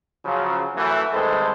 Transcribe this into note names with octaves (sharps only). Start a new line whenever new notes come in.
C#3 F3 F#3
F#2 E3 A3
C2 D#3 G#3 A4 B4 C5